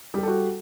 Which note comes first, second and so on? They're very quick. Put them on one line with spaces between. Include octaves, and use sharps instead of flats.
G3 G4 A4 F#4